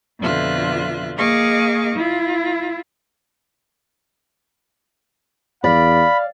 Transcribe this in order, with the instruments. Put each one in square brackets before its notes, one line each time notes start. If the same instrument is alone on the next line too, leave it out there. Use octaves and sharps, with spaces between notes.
[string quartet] F2 B2 D3 F4 E5 F#6
A#3 G#4 D#5 F5 C#6 D6
E4 F4
[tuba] E2 [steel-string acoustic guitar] D5 [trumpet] F5 [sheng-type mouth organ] B5